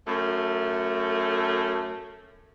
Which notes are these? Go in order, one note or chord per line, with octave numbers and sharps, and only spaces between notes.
F#2 A3